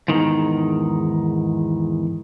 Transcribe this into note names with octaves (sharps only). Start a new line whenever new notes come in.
E2 G#2 D#3